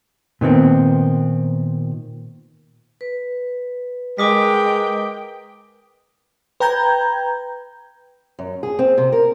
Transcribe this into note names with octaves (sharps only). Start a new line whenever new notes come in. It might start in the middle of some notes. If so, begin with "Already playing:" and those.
A#2 D#3 B3 C4
B4
G#3 A#4 G5 D6 D#6 B6
B4 G5 A#5 G6 G#6
F#2
G#4
C4
C3
A#4